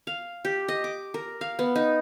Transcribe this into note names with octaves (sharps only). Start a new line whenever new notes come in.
F5
G4
D#5
D6
A#4
F5
B3
D#4